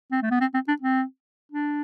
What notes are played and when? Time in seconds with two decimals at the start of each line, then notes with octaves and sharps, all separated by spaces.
0.12 C4
0.22 A3
0.31 B3
0.41 C4
0.54 C4
0.68 D4
0.82 C4
1.52 D4